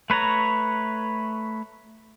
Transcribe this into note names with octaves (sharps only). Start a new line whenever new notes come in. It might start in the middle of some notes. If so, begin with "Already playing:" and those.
A3 B4 C#5 A#5